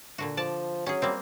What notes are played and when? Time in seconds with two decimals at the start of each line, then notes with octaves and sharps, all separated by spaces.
0.18 A#2 D3 F#4
0.37 F3 D5 A5
0.86 F#3 C#4 G#4
1.02 G3 A#3 C4